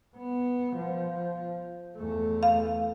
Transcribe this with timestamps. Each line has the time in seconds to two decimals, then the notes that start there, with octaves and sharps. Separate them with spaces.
0.17 B3
0.76 F3
1.97 E2 A3
2.43 F5